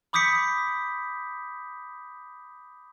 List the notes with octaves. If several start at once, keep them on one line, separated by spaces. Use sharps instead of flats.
B5 D6 D#6 G6 B6 C#7